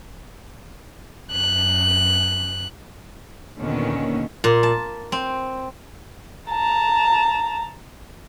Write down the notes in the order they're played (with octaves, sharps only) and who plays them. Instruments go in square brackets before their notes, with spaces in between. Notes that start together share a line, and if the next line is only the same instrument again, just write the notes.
[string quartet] F#2 F#6
[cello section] D#2 A#2 D3 D#3 B3 C#4
[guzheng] A#2
A5
C4
[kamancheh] A5 A#5